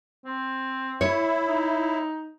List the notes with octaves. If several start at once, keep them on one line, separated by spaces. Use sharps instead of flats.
C4
E4 C#5
D#4